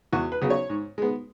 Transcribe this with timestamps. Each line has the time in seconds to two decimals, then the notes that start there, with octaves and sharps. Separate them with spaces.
0.12 E2 F#4
0.32 B4
0.42 C#3 F#3 B3
0.50 C#5
0.70 G#2
0.98 G#3 B3